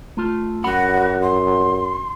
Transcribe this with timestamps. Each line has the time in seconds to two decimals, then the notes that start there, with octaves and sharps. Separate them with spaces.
0.17 A3 F4
0.64 F#2 F#4 F#5 B5
1.22 C6